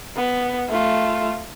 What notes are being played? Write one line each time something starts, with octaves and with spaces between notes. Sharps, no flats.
B3
A3 F4